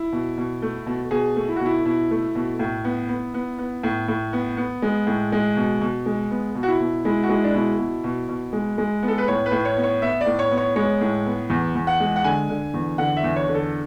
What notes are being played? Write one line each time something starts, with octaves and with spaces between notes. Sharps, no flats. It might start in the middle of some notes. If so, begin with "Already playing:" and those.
Already playing: E4
B2
B2
A3
B2
B2 G#4
A3
E4
F#4
B2
E4
B2 E4
A3
B2
A2
B3
B3
B3
B3
A2
A2
B3
B3
G#3
A2
G#3
B2
B2
G#3
B3
B2
F#4
E4
B2
G#3 E4
F#4
G#3 E4
D4
B2 E4
B2
B2
B2
G#3
G#3
B3
A4
B4
A2 C#5
B4
A2
C#5
B3
C#5
B3 E5
D5
A2
C#5
B3
C#5
G#3 C#5
A2
B3
E2
E2
F#5
G#3
F#5
D3 G#5
D3
E2
D3 F#5
E5
E2
C#5
D3
A4